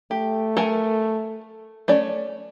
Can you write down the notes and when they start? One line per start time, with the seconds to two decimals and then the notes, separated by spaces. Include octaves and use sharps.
0.11 A3 G4
0.57 A4 A#4 G#5
1.88 A3 C#4 D5